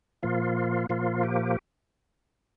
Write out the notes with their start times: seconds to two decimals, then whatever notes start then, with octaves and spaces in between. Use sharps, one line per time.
0.23 A#2 F3 A#3 F4
0.89 A#2 F3 A#3 F4
1.23 G4